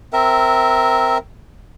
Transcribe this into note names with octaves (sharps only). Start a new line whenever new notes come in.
C4 A#4 E5